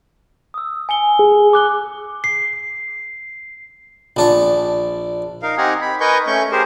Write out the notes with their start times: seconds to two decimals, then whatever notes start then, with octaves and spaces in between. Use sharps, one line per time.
0.54 D#6 E6
0.89 G#5 C#7 G7
1.19 G#4
1.53 D6 F#6 G7
2.24 C7
4.16 A#1 D4 C#6
5.42 D#4 A#4 F5
5.57 C4 D#4 G4 F#5 G#5 A#5
5.81 B5
6.00 A#4 B4 D#5 G#5 C#6 G6
6.27 A3 C#4 C#6 G6
6.52 G4 G#4 A#4 C5